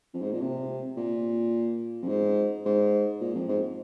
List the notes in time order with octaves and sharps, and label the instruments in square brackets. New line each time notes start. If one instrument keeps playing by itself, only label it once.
[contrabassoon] F2
G#2
A#2
C3
A#2
F2
G#2
G#2
A#2
F2
G#2